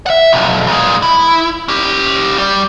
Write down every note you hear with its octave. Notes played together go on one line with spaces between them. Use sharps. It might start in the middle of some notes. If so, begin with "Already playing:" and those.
E5 F#5
B1 F2
A#2 G#3
E4
C#4 G4
G3